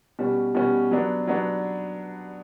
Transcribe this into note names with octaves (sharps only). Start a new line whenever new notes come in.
B2 G3 C#4
B2 G3 C#4
F#3 B3 D4
F#3 B3 D4